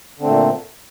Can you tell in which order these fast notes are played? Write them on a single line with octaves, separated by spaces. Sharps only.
D3 C4 A3 A#2